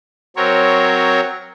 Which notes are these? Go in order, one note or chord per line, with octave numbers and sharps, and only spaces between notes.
F#3 C4 A#4 C#5